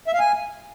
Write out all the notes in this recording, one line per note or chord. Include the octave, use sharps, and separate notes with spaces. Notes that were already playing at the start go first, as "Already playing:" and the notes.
E5
F5
G#5